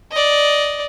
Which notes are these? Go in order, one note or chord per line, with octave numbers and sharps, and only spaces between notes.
D5 D#5